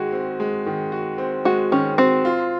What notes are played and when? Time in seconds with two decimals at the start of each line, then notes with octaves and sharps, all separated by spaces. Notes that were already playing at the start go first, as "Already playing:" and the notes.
Already playing: D#3 G#3 F#4 G#4
0.13 C4
0.40 G#3
0.66 D#3
0.92 F#4
1.18 C4
1.45 G#3 F#4
1.72 D#3 C#4
1.98 C4 F#4
2.25 F4